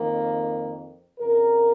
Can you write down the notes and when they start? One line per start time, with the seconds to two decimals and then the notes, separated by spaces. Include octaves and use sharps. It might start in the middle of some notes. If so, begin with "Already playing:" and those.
Already playing: F2 D#3 A#3
1.19 F2 C#3 A#4